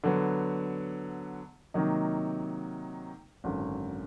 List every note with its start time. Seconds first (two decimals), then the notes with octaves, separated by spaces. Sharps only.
0.04 D3 F#3 B3
1.74 C3 D#3 F#3 A#3 D#4
3.44 G#1 F#2 D3 F#3